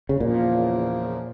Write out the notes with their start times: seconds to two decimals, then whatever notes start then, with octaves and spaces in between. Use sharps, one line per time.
0.09 C#3
0.20 E2 A#2 C#3 F3 A#3